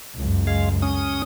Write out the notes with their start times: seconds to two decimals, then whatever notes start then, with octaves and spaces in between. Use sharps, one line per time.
0.17 C#2 F#2
0.47 G#3 F5
0.82 C#4 D#6